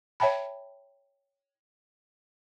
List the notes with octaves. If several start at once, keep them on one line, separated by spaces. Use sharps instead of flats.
C#5 E5 G5 A5 B5